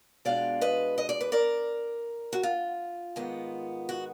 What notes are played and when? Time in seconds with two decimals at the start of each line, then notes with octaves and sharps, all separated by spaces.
0.25 B2 G#3 D4 F4 D5 F5
0.61 B4 D#5
0.98 D#5
1.09 D5
1.21 B4
1.32 A#4 D5
2.33 F#4
2.43 F4
3.16 G#2 D#3 G#3 B3
3.89 F#4